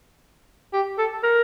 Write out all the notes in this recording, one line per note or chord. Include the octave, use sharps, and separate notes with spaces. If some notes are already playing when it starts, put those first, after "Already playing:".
G4
A4
A#4